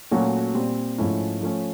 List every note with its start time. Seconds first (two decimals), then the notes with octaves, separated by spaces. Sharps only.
0.11 A#2 F#3 A3 C#4 F#4
0.54 A#2 G3 C4
0.98 G#2 F3 A3 C#4 E4
1.41 F3 A3 C#4